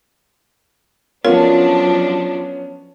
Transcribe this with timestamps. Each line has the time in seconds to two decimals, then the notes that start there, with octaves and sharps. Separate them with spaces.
1.25 F3 F#3 B3 C#4 D4 F4 A#4